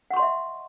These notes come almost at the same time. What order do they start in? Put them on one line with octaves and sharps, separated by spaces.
F#5 C#6 C6 D#5 E5